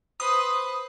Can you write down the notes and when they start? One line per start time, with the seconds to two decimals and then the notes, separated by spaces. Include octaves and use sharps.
0.20 B4 C5 D#6